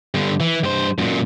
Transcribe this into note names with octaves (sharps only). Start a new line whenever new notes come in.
G2 D3
E3
G2 C5
F#2 A#2